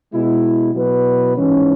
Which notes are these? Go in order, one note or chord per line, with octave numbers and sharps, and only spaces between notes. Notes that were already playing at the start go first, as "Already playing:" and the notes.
B2 G#3 E4
B2 F#3 E4 B4
G#2 E3 G#3 C#4